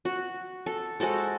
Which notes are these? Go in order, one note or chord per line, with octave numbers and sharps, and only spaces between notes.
F#4
A4
G#3 F#4 A4 C5